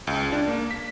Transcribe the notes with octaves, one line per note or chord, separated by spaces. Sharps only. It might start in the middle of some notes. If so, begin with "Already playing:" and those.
C#2
D4
A#3
B6